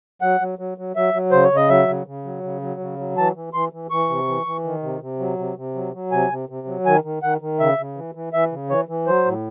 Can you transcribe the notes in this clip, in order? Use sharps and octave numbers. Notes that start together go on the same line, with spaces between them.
F#3 F#5
F#3
F#3
F#3
F#3 E5
F#3
C#3 C5
C#5
C#3
D#5
F#3 E5
C#3
C#3
F#3
C#3
F#3
C#3
F#3
E3 A5
E3
E3 C6
E3
E3 C#6
C3
E3
E3
D#3
C3
C3
F#3
C3
C3
F#3
F#3
C3 G#5
C3
C3
F#3
D#3 G#5
D#3
D#3 F#5
D#3
C#3 E5
C#3
E3
E3
E3 E5
C#3
E3 C#5
E3
F#3 C5
A2